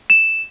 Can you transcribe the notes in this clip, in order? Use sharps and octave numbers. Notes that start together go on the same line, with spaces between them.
E7